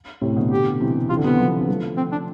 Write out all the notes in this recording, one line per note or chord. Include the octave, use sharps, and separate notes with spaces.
A2 C3
B2 D3
G4
C3 E3
C3 E3 F4
D3
C3 E3 B3
D3 F3
B3
F3 A3
C4
D4